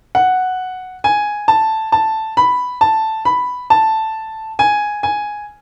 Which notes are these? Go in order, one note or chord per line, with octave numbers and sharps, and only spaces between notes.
F#5
G#5
A5
A5
B5
A5
B5
A5
G#5
G#5